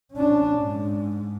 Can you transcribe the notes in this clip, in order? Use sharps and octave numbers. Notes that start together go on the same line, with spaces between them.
C#4 D4
G#2